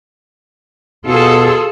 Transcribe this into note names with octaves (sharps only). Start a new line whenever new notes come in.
B2 F4 G#4 A4